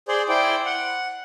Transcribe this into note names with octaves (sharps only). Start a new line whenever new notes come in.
G#4 C5 D5
E4 C5 D5 G5
F#5